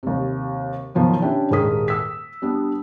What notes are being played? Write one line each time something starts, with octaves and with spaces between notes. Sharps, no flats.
D#2 C3
B2 D#3 F3 F#3 B3
C#4 D4 E4 G4 D5 G5
D#1 G#2 G#3 A#4 D#6 B6
D#6 E6 B6
G3 B3 D4